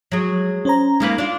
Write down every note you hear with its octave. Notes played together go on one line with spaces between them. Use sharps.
F#3 G#3
C#4 C5 A#5
G#3 A#3 D#4 B4
D4 F4